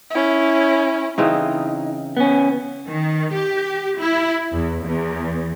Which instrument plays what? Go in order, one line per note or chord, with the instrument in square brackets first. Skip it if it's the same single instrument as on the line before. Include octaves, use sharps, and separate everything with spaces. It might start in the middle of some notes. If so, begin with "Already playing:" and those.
[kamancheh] C#4 E4
[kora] C#3 E3 C4 [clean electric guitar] D#4
[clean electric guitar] B3 C#4
[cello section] D#3
G4
E4
E2
E2